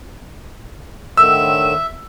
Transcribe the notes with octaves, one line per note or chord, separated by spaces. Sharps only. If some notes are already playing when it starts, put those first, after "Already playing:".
A2 D3 D#3 E5 E6 E7